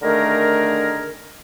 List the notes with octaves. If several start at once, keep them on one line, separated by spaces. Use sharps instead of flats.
D3 D#3 A3 D4 G#4 A#4